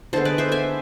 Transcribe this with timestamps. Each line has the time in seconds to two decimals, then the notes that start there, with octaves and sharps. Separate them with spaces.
0.13 D3 G#3 B3 A4 C5
0.25 B4 D5
0.38 C5 E5
0.52 E5 G#5